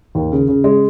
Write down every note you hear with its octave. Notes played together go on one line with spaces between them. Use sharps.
D#2
C#3
C#3
G#3